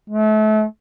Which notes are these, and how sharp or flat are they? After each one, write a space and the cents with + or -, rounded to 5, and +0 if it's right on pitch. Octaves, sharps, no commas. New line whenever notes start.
A3 -35